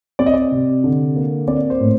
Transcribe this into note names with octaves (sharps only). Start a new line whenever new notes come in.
C4 D5
D#5
D5
C3
D3
A#3
C4 D5
C5
A2